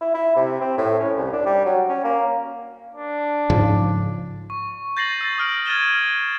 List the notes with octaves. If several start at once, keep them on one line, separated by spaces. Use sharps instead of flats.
E4
E4
C3
C4
A2
C#4
C2
D4
G3
F#3
C#4
A#3
D4
G#2 C#3 F3
C#6
G6 A6 A#6 C7 D#7 F#7
E6 A6
D#6 F6 D7
F6 G#6 A6 D#7 E7 G7